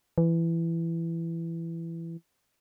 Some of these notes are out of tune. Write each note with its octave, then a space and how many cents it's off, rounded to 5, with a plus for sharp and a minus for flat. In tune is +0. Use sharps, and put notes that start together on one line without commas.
E3 +15